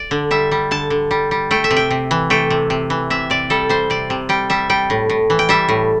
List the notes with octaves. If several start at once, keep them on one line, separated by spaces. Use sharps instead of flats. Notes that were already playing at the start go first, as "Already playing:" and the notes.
Already playing: D5
D3
G3 E5
G3
D3 A5
D3
G3
G3
A3 G5
E5
C3
G5
C3
E3
A3 G5
C3
C3
E3
C3 E5
C3 D5
G3 A4
G3 C5
C3 D5
C3
G3 G5
G3 E5
G3 G5
A2
A2
E3
G5
G3 E5
A2